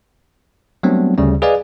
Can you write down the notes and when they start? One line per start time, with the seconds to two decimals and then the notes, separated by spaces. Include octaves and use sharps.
0.83 F#3 G3 A3 B3 C4 D4
1.18 D2 C#3 G3 C#4
1.42 G#4 B4 D5 D#5 F5 G#5